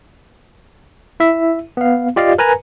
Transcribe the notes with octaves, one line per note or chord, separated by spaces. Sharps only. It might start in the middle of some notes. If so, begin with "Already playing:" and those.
E4 E5
B3 F5
F4 G4 D5 D#5 F5
A#4 B4 G#5 A#5